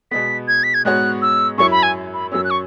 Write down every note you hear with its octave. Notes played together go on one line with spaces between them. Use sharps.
B2 G#3 B3 B6
G#6
B6
G#6
G#2 G#3 B3 F#4 C#5 F#6
E6
F#2 F#3 E4 C#5 C#6
B5
G#5
B5
F#2 F#3 C#4 E6
F#6
C#6